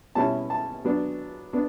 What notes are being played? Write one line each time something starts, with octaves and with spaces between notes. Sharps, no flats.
B2 G3 C#4 E4 A5
A5
F#3 B3 D4
B3 D4